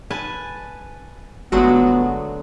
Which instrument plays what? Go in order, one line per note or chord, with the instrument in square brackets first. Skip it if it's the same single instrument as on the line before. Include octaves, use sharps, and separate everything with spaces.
[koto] B4 G#5 A5
[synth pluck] G1 G#3 F#4 [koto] D3 F#3 A3 [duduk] B3